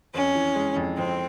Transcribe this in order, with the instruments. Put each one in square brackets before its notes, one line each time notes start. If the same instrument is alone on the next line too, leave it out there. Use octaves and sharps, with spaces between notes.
[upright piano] F2 [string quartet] C#4
[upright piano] E3
G#3
F2
[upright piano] F2 [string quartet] C4